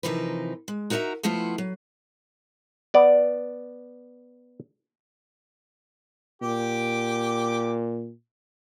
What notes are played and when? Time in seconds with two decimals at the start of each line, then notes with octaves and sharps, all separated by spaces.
0.03 C3 E3 F3 D#4 A#4 B4
0.68 G#3
0.90 D#4 F#4 A#4 D#5 E5 A#5
1.23 F3 A3 B3 E4 F4
1.58 F#3
2.94 B3 D5
6.42 A#2 G4 D6